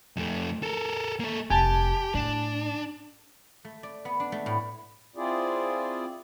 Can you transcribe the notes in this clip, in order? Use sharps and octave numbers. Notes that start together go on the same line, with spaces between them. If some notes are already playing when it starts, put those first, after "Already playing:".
F2 A3
A4 A#4
A#3 A4
F1 G4 G#5 A5
A2 D4
A3
D5
B3
D4
A3
A2
C4 E4 F4 G#4 D5